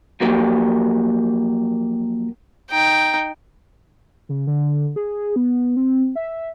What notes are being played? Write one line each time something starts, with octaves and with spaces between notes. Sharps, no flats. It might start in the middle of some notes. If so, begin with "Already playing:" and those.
F3 F#3 A#3 G4
D#4 G5
C#3
D3
G#4
B3
C4
E5